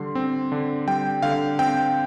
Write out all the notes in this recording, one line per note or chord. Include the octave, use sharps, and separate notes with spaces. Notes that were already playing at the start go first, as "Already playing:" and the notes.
Already playing: D3 G3 C6
C4
D3
G3 G5
D3 F5
C4 G5